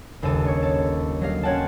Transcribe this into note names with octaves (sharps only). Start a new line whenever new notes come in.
G1 D#2 C#3 A4 D#7
C#5 C#6
A4
F#3 G3 D#5 F5
C4 C#4 C#5 F#5 G5 A5